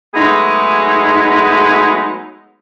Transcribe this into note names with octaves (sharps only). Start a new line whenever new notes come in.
F#3 G#3 A3 B3 D#4 G#4